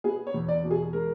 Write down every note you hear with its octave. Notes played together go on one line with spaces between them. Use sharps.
B3 G#4
C#5
E2
D5
B2
G#4
G#3 A#4